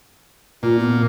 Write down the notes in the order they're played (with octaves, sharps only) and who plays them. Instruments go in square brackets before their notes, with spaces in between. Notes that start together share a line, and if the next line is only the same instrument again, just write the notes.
[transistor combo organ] A#2 [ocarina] F4
[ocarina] B3